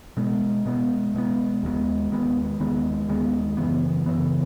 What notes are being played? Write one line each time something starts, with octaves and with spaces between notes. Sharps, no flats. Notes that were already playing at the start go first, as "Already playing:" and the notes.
B2 G#3 B3
B2 G#3 B3
B2 G#3 B3
D#2 D#3 G#3 B3
D#2 D#3 G#3 B3
D#2 D#3 G#3 B3
D#2 D#3 G#3 B3
F#2 C#3 E3 B3
F#2 C#3 E3 B3